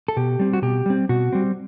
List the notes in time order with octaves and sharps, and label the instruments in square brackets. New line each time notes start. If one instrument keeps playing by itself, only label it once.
[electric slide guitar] A4
B2 G4
G3 C4
F#4
B2 G4
G3 C4
B2 F#4
G3 C4